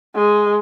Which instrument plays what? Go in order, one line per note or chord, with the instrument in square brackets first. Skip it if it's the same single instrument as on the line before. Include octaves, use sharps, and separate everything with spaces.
[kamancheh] G#3